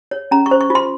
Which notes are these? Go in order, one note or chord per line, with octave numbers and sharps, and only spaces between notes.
C#5
C#4 A#5
C#6
C5
C#6
F4
C6